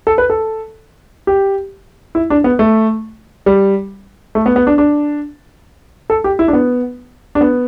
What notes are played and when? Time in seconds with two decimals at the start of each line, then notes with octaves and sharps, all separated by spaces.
0.07 A4
0.18 B4
0.30 A4
1.27 G4
2.15 E4
2.30 D4
2.44 B3
2.59 A3
3.46 G3
4.35 A3
4.46 B3
4.56 B3
4.67 D4
4.78 D4
6.10 A4
6.24 G4
6.39 E4
6.48 D4
6.53 B3
7.35 D4
7.41 B3